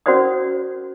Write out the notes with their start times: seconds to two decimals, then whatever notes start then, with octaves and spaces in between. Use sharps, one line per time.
0.06 C#4 F#4 A#4 C5 D5 D#6